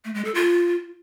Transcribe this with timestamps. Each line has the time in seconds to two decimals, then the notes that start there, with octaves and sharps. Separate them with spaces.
0.05 A3
0.15 G#3
0.25 A4
0.35 F4